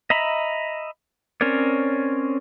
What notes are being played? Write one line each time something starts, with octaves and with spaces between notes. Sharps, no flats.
D#5 E5 A#5 B5
C4 C#4 A#4 C#5 D5